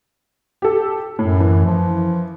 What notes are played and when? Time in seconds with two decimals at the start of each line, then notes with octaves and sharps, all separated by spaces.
0.62 G4 A4
1.19 F#2 A2
1.40 E3
1.65 F3